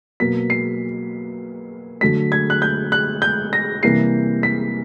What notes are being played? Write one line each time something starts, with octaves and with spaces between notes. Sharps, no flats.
B2 F#3 A#3 B6
C7
D3 F#3 A3 B6
G#6
F#6
G6
F#6
G6
A#6
C3 E3 G3 A#3 C7
B6